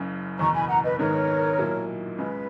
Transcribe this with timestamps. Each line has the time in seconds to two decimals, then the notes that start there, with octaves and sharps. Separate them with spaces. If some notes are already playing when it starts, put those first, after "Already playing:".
Already playing: F#1 F#2 C#3
0.39 F#1 E2 B2 A#5 C#6
0.54 G#5 B5
0.68 F#5 A#5
0.83 B4 D#5
0.99 G#1 G#2 D#3 G#3 B3 A#4 C#5
1.58 B1 A#2 F#3 A#3 E4
2.18 C#2 C#3 G#3 B4